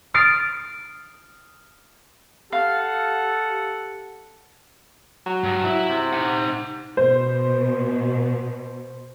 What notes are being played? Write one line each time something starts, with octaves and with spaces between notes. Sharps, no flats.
D#6 F6 A6 C7 D7
G4 A4 F5 F#5
F#3
G2
E4
C3
D#4 F#5
B2 C5